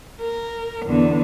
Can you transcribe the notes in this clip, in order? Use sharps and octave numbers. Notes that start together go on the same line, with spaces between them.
A#4
E2 D3